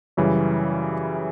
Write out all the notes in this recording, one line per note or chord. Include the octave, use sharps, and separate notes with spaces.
F#2 C#3 E3 G3